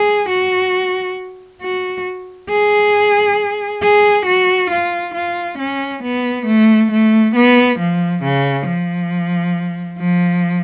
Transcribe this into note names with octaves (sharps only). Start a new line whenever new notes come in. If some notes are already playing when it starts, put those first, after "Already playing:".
Already playing: G#4
F#4
F#4
G#4
G#4
F#4
F4
F4
C#4
B3
A3
A3
B3
F3
C#3
F3
F3